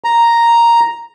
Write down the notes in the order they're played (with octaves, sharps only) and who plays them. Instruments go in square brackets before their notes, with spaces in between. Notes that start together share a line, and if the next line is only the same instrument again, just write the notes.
[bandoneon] A#5